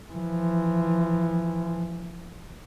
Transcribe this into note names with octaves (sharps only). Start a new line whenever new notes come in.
E3 F3